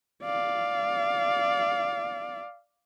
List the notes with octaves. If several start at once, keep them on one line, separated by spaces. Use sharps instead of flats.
D5 F5